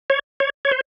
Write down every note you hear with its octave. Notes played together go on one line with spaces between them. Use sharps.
C#5
C#5
C#5
C5